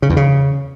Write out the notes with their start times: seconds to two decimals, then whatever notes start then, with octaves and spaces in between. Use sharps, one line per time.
0.02 C#3
0.10 E2
0.17 C#3